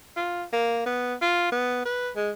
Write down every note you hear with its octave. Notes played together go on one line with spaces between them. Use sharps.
F4
A#3
B3
F4
B3
B4
G#3